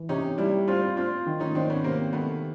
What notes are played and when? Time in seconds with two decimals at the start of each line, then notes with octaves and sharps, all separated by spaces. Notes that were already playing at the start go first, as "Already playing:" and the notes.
Already playing: E3
0.09 C3 C#4 D#4
0.38 G3 D4 E4
0.68 C4 D4 F4
0.97 C4 D4 F4
1.26 D#3
1.40 C#4 D#4
1.55 D#3 C4 D4
1.70 B3 C#4
1.84 C3 A#3 C4
2.13 D#3 A3 B3